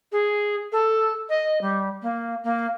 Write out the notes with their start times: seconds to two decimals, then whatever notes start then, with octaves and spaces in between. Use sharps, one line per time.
0.12 G#4
0.72 A4
1.29 D#5
1.61 G3
2.02 A#3
2.43 A#3